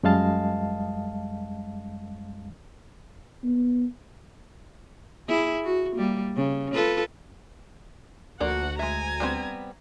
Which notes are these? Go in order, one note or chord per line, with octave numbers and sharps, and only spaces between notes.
F#2 G3 G#3 D#5 F5 A5
B3
E4 G#4
F#4
G3 A#3
C#3
F4 A4 B4
D2 F3 A#3 F#4 D5 F#5
G#3 E5 G#5 A#5
G3 B3 C4